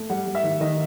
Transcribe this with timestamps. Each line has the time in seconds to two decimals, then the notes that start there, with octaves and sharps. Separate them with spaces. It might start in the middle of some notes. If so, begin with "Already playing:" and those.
Already playing: A3
0.10 G3 F#5
0.27 G3
0.35 E5
0.43 D#3
0.60 D#3 D#5